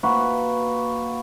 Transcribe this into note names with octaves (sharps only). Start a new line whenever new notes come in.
A#3 F#4 B4